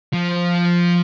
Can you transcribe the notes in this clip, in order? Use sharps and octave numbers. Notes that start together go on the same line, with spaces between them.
F3